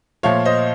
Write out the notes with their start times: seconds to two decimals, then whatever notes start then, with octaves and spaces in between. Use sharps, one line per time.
0.23 A#2 F3 A3 C#5 F5
0.45 C5 D#5